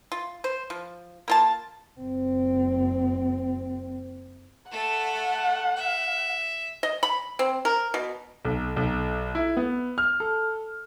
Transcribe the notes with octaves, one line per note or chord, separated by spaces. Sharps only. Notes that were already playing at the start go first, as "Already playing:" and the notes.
F4
C5
F3
A#3 F4 A5
F#1 C4
A3 A4 F#5
E5
D#5
B5
C4
A#4
B2
B1
B1
E4
B3
F6
A4